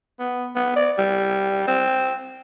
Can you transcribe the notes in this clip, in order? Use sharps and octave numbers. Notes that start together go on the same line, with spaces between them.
B3
B3
D5
G3
C4